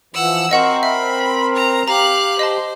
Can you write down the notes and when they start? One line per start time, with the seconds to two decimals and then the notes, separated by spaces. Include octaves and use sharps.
0.14 E3 F3 F#5 E6
0.51 C4 F#4 A#4 C5 D#5 F#5 C#6
0.83 E5 B5
1.56 A#5
1.88 G4 F5 A#5 F#6
2.39 C5 D#5 A5